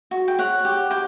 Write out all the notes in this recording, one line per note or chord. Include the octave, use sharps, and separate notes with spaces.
F#4
G5
C#5 F#5
G4
G4 G5